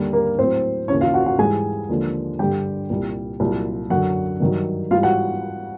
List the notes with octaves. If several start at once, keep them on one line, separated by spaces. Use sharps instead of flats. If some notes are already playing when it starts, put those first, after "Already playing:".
Already playing: D#2 D3 G3
A#3 A#4
A2 F#3 C4 C5
D#2 C#3 E3 C#4 C#5
F4 F5
F#4 F#5
F#4 F#5
G#2 E3 G3 G#4 G#5
D#2 D3 F3 G#3
G2 D3 G3 G4 G5
C2 A#2 G3
C2 A#2 F#3
F#2 D3 F#3 F#4 F#5
G2 D#3 F#3
G#2 E3 G3 F4 F5
F#4 F#5